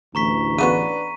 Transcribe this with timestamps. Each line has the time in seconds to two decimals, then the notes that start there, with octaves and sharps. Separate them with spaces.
0.15 A1 D2 E3 A#5 C#6 B6
0.58 C#3 B3 D4 F#4 B4 D#7